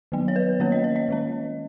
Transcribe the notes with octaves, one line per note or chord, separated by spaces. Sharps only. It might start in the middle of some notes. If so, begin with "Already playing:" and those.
D#3 F#3 B3
C#5
B4
D#3 A#3 C#4 C#5
D#5
C#5
D#5
D#3 G#3 C#4